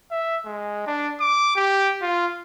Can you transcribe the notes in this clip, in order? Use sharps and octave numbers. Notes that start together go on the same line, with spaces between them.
E5
G#3
D4
D6
G4
F4